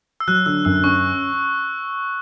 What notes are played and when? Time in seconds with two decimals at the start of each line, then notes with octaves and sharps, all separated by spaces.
0.20 E6
0.28 F#3 F#6
0.46 D3 E6
0.65 F#2 E6
0.84 C#4 C#6